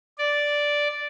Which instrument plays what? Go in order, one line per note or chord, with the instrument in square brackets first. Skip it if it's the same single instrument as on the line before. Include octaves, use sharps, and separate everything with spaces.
[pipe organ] D5